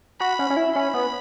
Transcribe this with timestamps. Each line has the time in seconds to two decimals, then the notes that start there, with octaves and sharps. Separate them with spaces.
0.20 F#4 B5
0.39 C#4
0.50 C#4
0.57 E4
0.74 C#4 B5
0.94 B3